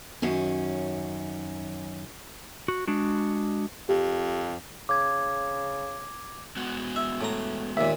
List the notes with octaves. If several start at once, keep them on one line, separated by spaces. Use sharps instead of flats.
F#2 D#3 C#4
F#4
G#3 D4 F#4
F2 G4
C#3 D6 G#6
G#3 B3 F#4
E5
A2 A#5
D#2 A#2 E5